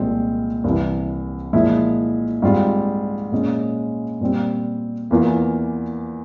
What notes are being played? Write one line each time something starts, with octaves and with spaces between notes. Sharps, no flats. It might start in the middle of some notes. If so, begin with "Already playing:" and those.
Already playing: C2 A#2 F3 G#3 C4
C2 C3 E3
A#2 F3 G#3 E4
G#2 G3 C4 F4
A#2 G#3 C#4
A#2 G3 C4
E2 E3 A#3 F4